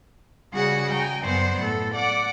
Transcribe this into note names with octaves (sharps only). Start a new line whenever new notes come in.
C#3 G3 F#4 G#4 D5 F#5
G5 G#5 A#5
F#2 F#3 B3 C5 D5 F#5
A2 A4
D5 F#5 D6